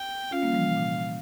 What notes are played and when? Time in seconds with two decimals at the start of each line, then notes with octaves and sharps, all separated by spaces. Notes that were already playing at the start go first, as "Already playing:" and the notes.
Already playing: G5
0.31 C#4 F4 F5
0.42 G3 A#3
0.50 F3
0.54 E3 G3
0.65 C3
0.77 A#2